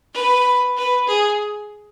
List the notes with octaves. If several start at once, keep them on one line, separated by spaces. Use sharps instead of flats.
B4
B4
G#4